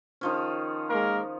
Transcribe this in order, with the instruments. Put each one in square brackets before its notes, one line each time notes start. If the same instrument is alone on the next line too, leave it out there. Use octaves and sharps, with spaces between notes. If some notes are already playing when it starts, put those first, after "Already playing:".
[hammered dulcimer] D#3 F3 C#4
[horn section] G#3 A#3 A#4